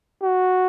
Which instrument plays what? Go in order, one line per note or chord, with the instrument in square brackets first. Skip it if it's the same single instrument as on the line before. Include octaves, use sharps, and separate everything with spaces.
[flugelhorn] F#4